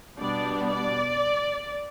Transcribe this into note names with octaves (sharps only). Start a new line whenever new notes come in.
B2 G3 B3 D4 D5
D5